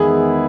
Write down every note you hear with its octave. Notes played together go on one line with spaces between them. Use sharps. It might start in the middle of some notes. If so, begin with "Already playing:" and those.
Already playing: E2 D#3 G#3 B3 E4 G#4